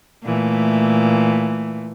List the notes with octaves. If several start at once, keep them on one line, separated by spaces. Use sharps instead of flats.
A#2 E3 A3